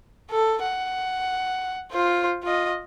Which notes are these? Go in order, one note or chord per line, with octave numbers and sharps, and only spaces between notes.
A4
F#5
F4 C5
F4 D#5